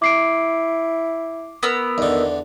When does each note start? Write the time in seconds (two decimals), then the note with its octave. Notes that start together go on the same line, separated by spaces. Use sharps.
0.02 E4 D6 C7 D7
1.63 B3 A#4 E6
1.98 E2 D3 D#3